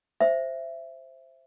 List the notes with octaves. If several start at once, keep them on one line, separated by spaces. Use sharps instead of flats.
C5 E5